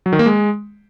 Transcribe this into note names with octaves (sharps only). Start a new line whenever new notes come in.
F#3
D#3
A#3
G#3